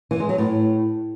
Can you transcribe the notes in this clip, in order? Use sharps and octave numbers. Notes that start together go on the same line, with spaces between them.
E3
G#3
F#3
A2